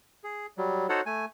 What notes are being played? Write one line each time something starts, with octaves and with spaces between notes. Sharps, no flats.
G#4
F#3 G3
D#4 F#4 A4 C5 C#5 F#5
A3 G#5